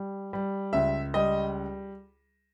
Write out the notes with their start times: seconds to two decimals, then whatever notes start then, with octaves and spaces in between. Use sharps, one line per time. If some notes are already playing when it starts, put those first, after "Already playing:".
Already playing: G3
0.33 G3
0.73 C#2 E5
1.14 G3 D#5